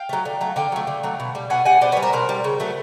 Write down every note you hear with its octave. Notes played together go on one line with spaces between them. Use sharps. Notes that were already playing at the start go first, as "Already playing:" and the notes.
Already playing: F5 G5
F#3 A3
D3
F#3 A3
D3 F5 G5
F#3 A3
D3
F#3 A3
B2
G3
B2 F#5 G#5
G3 F#5 G#5
B2 C5 D5
G3 B4 C#5
A#4 C5
B2 A#4 C5
G3
C#3
F#3 A3